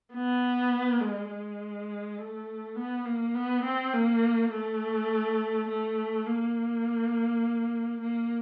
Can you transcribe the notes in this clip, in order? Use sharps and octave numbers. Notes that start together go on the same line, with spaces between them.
B3
G#3
G#3
A3
B3
A#3
B3
C4
A#3
A3
A3
A#3
A#3